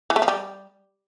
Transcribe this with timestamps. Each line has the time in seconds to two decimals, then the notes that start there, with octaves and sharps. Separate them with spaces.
0.10 E3
0.16 A3
0.22 F3
0.28 G3